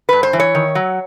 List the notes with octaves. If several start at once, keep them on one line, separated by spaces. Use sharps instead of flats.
G2 B4
C5
E3
C#5
D#3
F#3